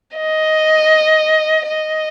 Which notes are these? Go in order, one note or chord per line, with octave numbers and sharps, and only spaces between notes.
D#5
D#5